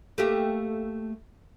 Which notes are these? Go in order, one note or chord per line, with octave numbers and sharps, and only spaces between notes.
A3 A#3 G4